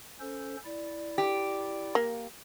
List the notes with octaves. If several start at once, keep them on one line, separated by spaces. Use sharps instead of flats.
C#4 A4 C5
E4 D5
G4
A#3